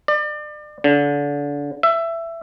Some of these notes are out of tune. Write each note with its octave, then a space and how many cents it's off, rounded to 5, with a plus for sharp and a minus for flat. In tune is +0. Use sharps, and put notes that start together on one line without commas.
D5 +35
D3 -30
E5 +15